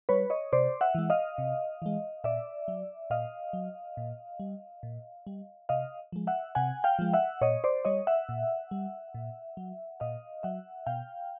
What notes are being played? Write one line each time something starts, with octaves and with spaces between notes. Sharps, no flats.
G3 B4 C#5
C#5 D#5
C3 C5 D5
E5 F#5
E3 G#3
D#5 F5
C3
E3 G#3
A#2 D5 E5
F#3
A#2 D#5 F5
F#3
A#2
G3
A#2
G3
C3 D#5 F5
F3 G#3
E5 F#5
C3 F#5 G#5
F5 G5
F3 G#3
E5 F#5
A#2 C#5 D#5
C5 D5
G3 C#5 D#5
E5 F#5
A#2
G3
A#2
F#3
A#2 D#5 F5
F#3 E5 F#5
B2 F5 G5